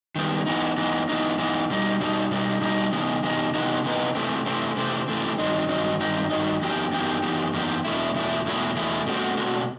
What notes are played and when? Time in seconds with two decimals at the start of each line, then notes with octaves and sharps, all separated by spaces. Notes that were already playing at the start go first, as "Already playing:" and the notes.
0.16 D#3 G3 B3
0.46 E3 B3 D#4
0.77 E3 B3 D#4
1.09 E3 B3 D#4
1.39 E3 B3 D#4
1.70 B2 G3 D#4
2.00 B2 G3 D#4
2.31 B2 G3 D#4
2.61 B2 G3 D#4
2.92 C3 E3 B3 D#4
3.23 C3 E3 B3 D#4
3.54 C3 E3 B3 D#4
3.85 C3 E3 B3 D#4
4.15 C3 E3 A3 C4
4.46 C3 E3 A3 C4
4.77 C3 E3 A3 C4
5.08 C3 E3 A3 C4
5.38 G2 D#3 F#3 C4 D#4
5.69 G2 D#3 F#3 C4 D#4
6.01 G2 D#3 F#3 C4 D#4
6.30 G2 D#3 F#3 C4 D#4
6.61 F#2 E3 B3 D#4 G4
6.92 F#2 E3 B3 D#4 G4
7.23 F#2 E3 B3 D#4 G4
7.53 F#2 E3 B3 D#4 G4
7.85 E2 B2 A3 E4
8.15 E2 B2 A3 E4
8.46 E2 B2 A3 E4
8.76 E2 B2 A3 E4
9.06 B2 A3 C4 F#4
9.37 B2 A3 C4 F#4